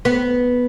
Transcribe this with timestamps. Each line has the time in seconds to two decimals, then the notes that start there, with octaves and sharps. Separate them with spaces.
0.05 B3